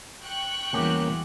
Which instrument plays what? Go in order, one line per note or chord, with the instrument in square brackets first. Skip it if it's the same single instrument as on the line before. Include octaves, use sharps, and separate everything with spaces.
[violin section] G5 C#6 F#6
[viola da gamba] E2 E3 G3 [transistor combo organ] C#3 A#3 [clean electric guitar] G#3 F#4 G4